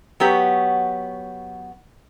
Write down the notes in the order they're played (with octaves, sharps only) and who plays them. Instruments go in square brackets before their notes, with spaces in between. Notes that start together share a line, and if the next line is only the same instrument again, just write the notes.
[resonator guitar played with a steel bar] F#3 B3 G4 C#5